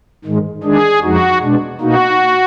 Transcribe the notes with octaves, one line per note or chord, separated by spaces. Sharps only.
G#2 D#3 G#3
D#3 G#3 D4 G#4
F2 F3 G#3 D#4 F#4
B2 G#3 D4
B2 A#3 D#4 F#4